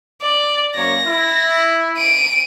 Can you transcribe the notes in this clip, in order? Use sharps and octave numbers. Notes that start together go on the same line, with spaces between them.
D5
F#2 A#3 C#5 A#6
E4
D7 D#7